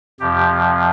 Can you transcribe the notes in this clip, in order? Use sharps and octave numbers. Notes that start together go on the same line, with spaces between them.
F2 C3 F3 G4